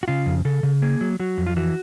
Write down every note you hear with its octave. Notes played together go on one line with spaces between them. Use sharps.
F#4
C#3 F4
F2
C#3 A4
C#3
A#3 G#4
F#3
F#3 F#4
F2
F4
E3 F#4